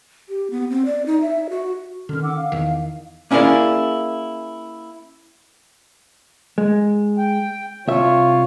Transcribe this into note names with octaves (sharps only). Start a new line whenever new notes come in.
G4
B3
C4
D5
D#4
E5
F#4
D3 D#3 C#4 F6
F#5 D6 E6
F5
E2 D#3
A#3 C#4 E4 G#4 A#4 D5
G#3
G5
C2 F4 C#5 E5